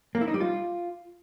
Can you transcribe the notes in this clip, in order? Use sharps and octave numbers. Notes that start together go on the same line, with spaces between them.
A#3
E4
D#4
G3
F4